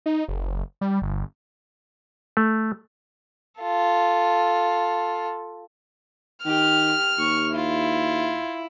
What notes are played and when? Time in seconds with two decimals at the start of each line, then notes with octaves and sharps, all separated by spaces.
0.06 D#4
0.28 F#1
0.81 G3
1.02 G1
2.37 A3
3.61 F4 A4
6.45 D#3 G4 F6
7.18 D#2 C#6
7.55 E4 F4